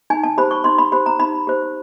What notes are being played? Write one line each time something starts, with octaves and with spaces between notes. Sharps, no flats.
D#4 G#5
A5
G4 C5 B5
C#6
D#4 C6
B5
G4 C5 B5
A#5
D#4 B5
G4 C5